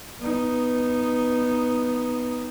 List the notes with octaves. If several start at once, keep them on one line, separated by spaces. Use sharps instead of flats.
B3 D#4